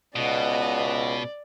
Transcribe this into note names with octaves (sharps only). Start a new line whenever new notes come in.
C#2 B2 D5 D#5 F#5